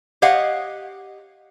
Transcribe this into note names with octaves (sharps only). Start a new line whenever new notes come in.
G4 C#5 D#5 F5 F#5